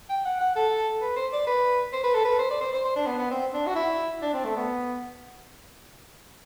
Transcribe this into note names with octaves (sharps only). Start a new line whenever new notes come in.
G5
F#5
F#5
A4
B4
C5
D5
B4
C5
B4
A4
B4
C5
D5
C5
C5
C5
D4
B3
B3
C4
D4
F#4
E4
D4
C4
A3
B3